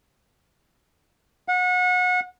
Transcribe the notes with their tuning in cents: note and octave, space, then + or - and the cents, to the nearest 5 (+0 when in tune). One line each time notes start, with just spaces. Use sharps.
F#5 -30